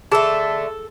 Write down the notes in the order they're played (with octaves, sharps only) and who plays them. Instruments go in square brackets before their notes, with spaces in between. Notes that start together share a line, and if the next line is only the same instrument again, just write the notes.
[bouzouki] D3 A3 [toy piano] G#4 [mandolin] A4 A5